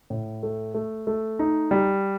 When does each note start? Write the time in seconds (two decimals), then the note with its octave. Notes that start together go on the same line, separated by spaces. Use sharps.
0.10 A2
0.43 A3
0.74 A3
1.07 A3
1.39 D#4
1.71 G3